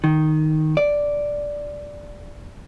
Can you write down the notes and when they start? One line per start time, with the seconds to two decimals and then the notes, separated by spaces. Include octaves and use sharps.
0.04 D#3
0.77 D5